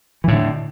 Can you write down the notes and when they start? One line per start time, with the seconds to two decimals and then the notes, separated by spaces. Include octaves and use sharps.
0.24 E3
0.28 A2
0.32 D3